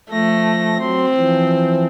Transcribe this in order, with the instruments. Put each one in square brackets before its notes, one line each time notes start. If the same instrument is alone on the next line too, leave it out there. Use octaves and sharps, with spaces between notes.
[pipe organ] F3 A#6 [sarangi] A3
[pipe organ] F#3 C6 [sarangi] C4
[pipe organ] E3 F3